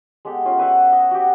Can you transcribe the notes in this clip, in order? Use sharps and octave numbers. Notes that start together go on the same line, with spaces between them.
G#3 B3 G4 A4
C#4 F4 G5
B4 E5 F#5
D#5
F#4 G4